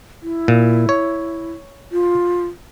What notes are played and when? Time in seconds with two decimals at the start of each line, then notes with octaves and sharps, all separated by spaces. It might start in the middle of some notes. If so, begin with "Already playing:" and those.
0.22 E4
0.48 A#2
0.89 C#5
1.92 F4